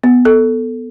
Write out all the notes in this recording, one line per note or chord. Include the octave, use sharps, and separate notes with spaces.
B3
A4